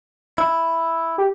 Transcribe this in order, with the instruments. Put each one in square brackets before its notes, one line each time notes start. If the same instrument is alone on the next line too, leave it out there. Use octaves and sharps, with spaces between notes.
[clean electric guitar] E4
[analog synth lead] G4